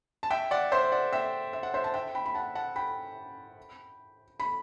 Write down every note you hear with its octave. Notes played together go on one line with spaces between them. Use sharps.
A5
E5 G5
D5 F#5
C5 E5
D5 F#5
E5 G5
E5
F#5
C5 E5
A5
E5 G5
G5 B5
B5
F#5 A5
F#5 A5
G5 B5
B5